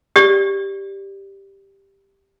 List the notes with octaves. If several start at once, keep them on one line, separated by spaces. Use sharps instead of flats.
G4 D5